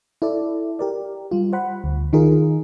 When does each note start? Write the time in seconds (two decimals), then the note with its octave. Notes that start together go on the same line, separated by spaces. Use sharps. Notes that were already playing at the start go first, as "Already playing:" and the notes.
0.22 E4 A4 D5
0.79 G4 A#4 D5
1.31 G3 F4
1.53 C5 F#5 B5
1.84 D2
2.13 D#3 D#4 F4 G#4 A#4